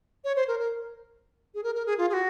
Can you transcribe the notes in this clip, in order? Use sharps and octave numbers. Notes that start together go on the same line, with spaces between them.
C#5
C5
A#4
A#4
G#4
A#4
A#4
G#4
F4
G#4
F#4